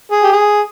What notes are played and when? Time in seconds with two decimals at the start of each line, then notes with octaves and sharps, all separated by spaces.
0.11 G#4
0.23 G4
0.32 G#4